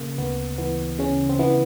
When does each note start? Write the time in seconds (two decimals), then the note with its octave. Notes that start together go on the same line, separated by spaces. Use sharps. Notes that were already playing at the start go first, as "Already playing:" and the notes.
Already playing: C#3 A#3
0.18 D2 B3
0.58 E3 B3
0.99 C#3 C#4
1.29 C4
1.39 E3 B3